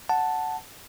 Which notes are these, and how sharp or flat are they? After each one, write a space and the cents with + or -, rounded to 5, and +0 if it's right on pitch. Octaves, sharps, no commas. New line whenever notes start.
F#5 +0 A5 +0